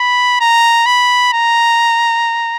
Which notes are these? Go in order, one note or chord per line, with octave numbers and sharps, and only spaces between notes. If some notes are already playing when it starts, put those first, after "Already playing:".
Already playing: B5
A#5
B5
A#5